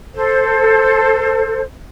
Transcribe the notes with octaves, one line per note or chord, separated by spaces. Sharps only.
A4 C5